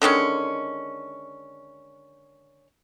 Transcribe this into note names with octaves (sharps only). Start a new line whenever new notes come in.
D3 D#3 G#3 C#4